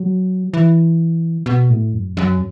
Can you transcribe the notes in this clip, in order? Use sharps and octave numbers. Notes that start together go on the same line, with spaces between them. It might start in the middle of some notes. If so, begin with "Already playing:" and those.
Already playing: F#3
E3
B2
A2
F#2
F#2